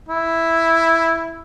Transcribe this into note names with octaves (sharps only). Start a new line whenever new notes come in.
E4